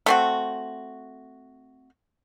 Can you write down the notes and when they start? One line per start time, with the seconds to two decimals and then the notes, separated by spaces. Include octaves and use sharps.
0.06 A3 C4 F#4